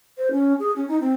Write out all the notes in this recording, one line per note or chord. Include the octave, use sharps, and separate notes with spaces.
C5
C#4
G#4
C#4
D#4
C4